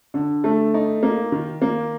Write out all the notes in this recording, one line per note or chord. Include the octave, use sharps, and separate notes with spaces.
D3
A3
D#4
A#3
D#3
A#3